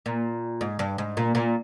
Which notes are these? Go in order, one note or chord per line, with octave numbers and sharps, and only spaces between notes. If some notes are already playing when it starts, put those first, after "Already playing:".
A#2
G#2
G2
G#2
A#2
A#2